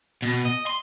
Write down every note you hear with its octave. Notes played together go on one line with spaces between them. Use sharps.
B2
D#5
C6